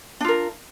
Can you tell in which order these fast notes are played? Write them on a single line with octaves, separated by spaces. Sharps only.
D4 F4 A#4